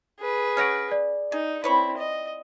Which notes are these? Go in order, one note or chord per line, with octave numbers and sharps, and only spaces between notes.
G#4 B4
C#4 C#5 F#5 F6 A#6 D7
D5
D#4 G#4
C4 E4 B4 C#5 B5
D#5